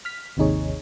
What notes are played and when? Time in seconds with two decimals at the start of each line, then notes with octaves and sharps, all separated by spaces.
0.05 F6 B6
0.37 G#1 D#2 C3 D#4 G#4 C#5